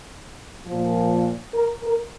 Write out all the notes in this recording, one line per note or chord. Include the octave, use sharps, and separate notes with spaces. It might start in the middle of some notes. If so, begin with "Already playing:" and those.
F3
A#2
A#4
A#4